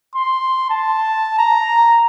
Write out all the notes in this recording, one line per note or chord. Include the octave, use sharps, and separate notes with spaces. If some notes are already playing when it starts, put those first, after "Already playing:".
C6
A5
A#5